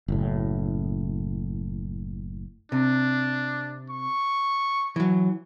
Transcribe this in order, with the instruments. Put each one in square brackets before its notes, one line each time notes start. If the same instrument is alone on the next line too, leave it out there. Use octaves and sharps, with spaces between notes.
[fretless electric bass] F#1 A2
[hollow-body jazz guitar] C3 [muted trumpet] D4
[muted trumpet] C#6
[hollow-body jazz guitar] E3 F#3